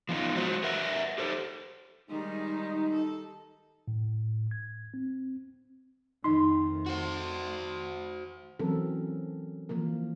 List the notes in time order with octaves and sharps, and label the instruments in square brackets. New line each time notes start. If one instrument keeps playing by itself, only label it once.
[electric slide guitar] F3 B3 D#4 F4
F#3 G#3 F#4 C5
A#4 B4 E5 F#5
G4 A4 C5
[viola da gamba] D#3 G3 G#3 [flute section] D#4
[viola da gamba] A4
[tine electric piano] A2
G#6
C4
[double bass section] F2 D#3 A3 [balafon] D#4 D#5 [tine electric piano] C6
[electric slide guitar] F#4 C5
[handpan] E3 F#3 C4 C#4 A4 A#4
E3 F3 A#3 A#4